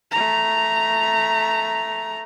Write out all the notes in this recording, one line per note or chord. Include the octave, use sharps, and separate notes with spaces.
A3 A#5